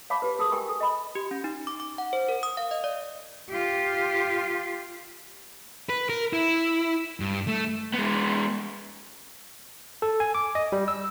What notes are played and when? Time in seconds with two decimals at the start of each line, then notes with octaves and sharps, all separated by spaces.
0.10 C#5 F5 A5 B5 D6
0.22 G4 B4
0.39 G#4 A#4 A5 C#6 D#6
0.52 G4 A#4 G5 G#5 C#6
0.69 A4
0.80 D#5 B5
1.15 G4
1.31 C#4
1.44 D#4
1.67 D6
1.80 D6
1.98 F#5
2.13 C5
2.29 A#4
2.43 D#6
2.57 F5
2.71 D#5
2.84 D5
3.50 F4 G4
5.89 B4
6.09 A#4
6.33 E4
7.20 G2
7.48 A3
7.94 G#3 B3
10.02 A4
10.20 G#5
10.35 D6
10.55 D#5
10.72 G3
10.88 E6